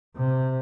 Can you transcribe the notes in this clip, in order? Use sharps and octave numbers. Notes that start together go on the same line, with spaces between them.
C3